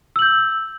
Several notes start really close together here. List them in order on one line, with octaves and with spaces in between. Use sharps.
E6 F#7 G6